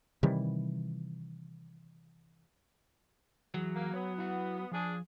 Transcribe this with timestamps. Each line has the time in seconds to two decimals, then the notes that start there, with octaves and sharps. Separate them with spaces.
0.23 C3 D#3 E3 G3
3.54 E3 F#3 G#4
3.74 A#3
3.94 B3 C#5
4.18 E4 F#5
4.72 F3 D4 G#4